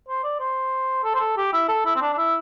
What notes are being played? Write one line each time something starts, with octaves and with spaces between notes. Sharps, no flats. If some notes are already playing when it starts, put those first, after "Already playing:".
C5
D5
C5
A4
C5
A4
G4
E4
A4
E4
C4
D4
D4
E4